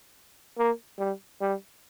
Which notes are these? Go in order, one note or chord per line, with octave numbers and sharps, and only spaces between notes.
A#3
G3
G3